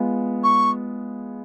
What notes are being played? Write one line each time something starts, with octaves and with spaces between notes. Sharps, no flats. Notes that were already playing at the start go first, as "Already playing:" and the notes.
Already playing: G#3 B3 F4
C#6